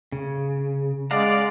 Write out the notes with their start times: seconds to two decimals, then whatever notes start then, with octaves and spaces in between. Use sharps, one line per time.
0.12 C#3
1.11 G#3 D5 F5 F#5 A#5